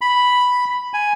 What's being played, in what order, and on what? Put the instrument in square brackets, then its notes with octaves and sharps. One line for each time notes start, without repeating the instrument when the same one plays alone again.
[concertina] B5
G#5